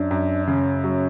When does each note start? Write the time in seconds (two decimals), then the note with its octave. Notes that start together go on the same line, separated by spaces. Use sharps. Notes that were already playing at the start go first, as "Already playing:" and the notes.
Already playing: F#2 D4
0.11 F#2
0.47 C#3 C#4
0.84 F#3